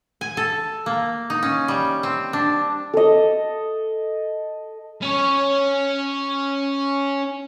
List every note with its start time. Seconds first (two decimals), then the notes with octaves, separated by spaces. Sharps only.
0.21 G#5
0.37 A4
0.86 A#3
1.30 D#4
1.43 C#4
1.68 G3
2.03 C4
2.33 D4
2.93 A4 D#5
5.02 C#4 C#5